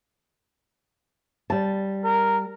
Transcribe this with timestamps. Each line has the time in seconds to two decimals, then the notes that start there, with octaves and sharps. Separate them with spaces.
1.50 G3 A5
2.04 A#4